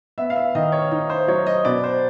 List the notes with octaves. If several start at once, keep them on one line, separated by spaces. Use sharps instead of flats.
B3 E5
F5
E5
D#3 D#5
C#5
D#4
C5
F#3 C#5
D#5
B2 D5
C5